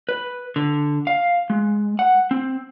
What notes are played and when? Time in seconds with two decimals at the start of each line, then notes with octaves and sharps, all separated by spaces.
0.09 B4
0.56 D3
1.07 F5
1.50 G#3
1.99 F#5
2.31 C4